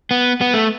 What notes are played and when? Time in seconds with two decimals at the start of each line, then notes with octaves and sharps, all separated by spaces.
0.11 B3
0.41 B3
0.54 A3